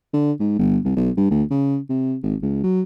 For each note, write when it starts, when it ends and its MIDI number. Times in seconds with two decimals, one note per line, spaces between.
0.14 0.32 50
0.40 0.56 44
0.59 0.78 31
0.85 0.94 36
0.96 1.10 35
1.17 1.31 43
1.31 1.43 38
1.51 1.79 49
1.89 2.16 48
2.23 2.36 32
2.42 2.62 37
2.64 2.82 54